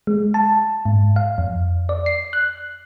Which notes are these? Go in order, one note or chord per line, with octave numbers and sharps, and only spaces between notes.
G#3
A5
G#2
F5
F2
D5
C7
F#6